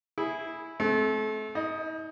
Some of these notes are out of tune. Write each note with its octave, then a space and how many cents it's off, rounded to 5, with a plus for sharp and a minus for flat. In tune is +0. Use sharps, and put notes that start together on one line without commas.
E4 -10 G#4 +0
A3 -35 C4 +0
D#4 +40 D#5 +0